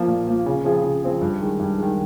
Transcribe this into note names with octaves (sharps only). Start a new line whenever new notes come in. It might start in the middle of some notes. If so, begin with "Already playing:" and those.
Already playing: F3 A#3
A#2
F3 A#3
C#3
F3 C4 F4 G#4
C#3
F3 C4 F4 G#4
G2
D#3 G#3
G2
D#3 G#3